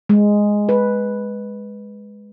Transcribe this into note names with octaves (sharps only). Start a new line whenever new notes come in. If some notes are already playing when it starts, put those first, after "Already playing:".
G#3
B4